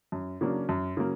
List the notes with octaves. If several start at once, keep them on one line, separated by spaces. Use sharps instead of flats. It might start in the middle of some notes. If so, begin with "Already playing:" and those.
F#2
C#3 F#3 A#3 D4
F#2
C#3 F#3 A#3